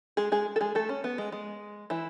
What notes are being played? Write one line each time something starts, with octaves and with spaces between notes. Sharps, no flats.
G#3 G#4
G#3 G#4
A4
G#3 G#4
A3 A4
C#4
B3
G#3
G#3
E3 E4